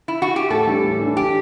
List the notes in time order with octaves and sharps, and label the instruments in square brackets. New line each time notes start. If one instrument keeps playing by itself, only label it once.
[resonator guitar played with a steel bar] E4
F#4
G4
[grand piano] A2 [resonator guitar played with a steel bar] A4
[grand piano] E3 G3 D4
A2
E3 G3 D4
[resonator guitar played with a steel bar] G4